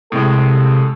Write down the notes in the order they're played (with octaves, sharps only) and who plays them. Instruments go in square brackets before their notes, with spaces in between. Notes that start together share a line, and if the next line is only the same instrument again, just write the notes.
[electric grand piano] A2 G#3 [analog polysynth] C3 [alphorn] A4